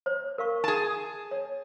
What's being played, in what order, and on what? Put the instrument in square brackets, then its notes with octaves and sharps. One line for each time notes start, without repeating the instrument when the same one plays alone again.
[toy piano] C5 C#5
A#4 F5 C#6
[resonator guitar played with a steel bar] G#4 A5
[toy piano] C#5